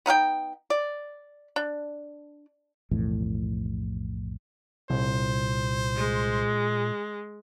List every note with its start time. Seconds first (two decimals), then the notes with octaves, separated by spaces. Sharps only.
0.06 B3 D#4 F5 G5
0.70 D5
1.56 D4
2.91 B1 F2 A2 E3
4.90 C2 A#2 C5
5.96 G#3